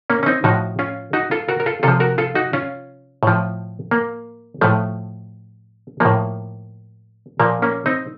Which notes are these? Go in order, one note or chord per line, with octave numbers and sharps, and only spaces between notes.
A#3 C#4
C#4
C4 D#4
A2 F3 D#4 F#4
C#4 F4
D#4 F#4
F4 A4
F#4 A#4
A#4
F4 A4
C3 F3 F4 A4
F#4 A#4
F4 A4
D#4 F#4
C#4 F4
A2 F3
A#3
A2 F3 A3
A2 F3 A#3
A#2 F3 A#3
A#3 C#4
C4 D#4